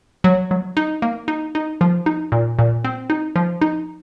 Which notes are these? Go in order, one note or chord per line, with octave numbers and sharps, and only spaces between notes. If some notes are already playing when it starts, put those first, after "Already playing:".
F#3
F#3
D#4
A#3
D#4
D#4
F3
D#4
A#2
A#2
C4
D#4
F3
D#4